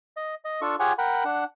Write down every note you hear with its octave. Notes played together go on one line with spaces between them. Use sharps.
D#5
D#5
D4 F4 A4 C#6
F4 G4 G#4 C#5 F#5 G#5
A#4 F#5 G5 B5
D4 F#5